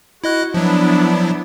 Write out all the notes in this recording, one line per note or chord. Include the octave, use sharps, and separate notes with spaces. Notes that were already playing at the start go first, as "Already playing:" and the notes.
E4 F#4 D#5 F#6
F3 F#3 B3 D4 E4